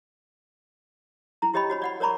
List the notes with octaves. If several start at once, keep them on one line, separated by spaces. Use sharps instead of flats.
E4 A#5
E4 G4 C#5 D#5 G5 B5
F#4 C#5 B5
D5 F#5 B5
A#4 C#5 D5 A#5 B5 C#6